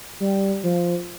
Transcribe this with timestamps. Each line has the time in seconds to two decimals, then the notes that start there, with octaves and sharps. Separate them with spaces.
0.20 G3
0.64 F3